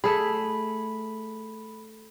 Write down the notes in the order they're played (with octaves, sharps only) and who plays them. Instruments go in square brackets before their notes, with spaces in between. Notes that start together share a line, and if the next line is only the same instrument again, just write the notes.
[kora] A3 G#4 [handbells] B5